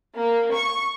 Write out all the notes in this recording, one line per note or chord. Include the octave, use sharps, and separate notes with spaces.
A#3
C#6